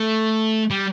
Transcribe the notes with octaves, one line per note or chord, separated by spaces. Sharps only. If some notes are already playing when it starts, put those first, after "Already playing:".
Already playing: A3
G3